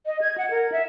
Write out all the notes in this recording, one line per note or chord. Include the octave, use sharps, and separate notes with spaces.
D#5
G#6
F#5
A#4
E5